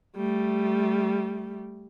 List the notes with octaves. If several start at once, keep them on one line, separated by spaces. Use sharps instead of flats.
G3 A3